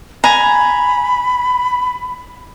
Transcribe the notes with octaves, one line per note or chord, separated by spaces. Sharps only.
G#5 A#5 B5